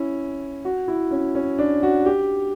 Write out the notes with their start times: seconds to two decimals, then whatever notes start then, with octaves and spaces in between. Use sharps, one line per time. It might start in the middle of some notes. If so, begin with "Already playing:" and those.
Already playing: C#4 E4
0.65 F#4
0.88 E4
1.11 C#4
1.35 C#4
1.58 D4
1.83 F#4
2.06 G4